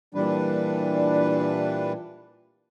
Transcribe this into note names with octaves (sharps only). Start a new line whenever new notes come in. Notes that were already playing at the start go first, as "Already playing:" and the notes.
A#2 E3 G3 D4 B4